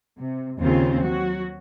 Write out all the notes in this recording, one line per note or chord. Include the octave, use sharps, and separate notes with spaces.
C3
D#2 C#3 C4 F4
F#3 F#4